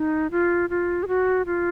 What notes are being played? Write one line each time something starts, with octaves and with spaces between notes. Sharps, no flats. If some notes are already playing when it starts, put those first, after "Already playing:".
Already playing: D#4
F4
F4
G#4
F#4
F4